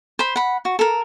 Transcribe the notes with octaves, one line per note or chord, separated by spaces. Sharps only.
C5 B5
F#5 B5
F#4
A4 A#4